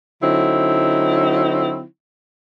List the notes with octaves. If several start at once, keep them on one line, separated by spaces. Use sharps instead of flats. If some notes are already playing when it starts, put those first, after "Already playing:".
D3 F#3 C4 D#4 E4